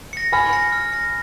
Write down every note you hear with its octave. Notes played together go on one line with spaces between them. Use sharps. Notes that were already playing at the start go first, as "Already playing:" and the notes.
A#6 C#7
G#5 B5 F6
A#6 C#7
F6
A#6 C#7